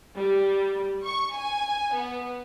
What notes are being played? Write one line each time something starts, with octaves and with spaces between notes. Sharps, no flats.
G3
C#6
G#5
B3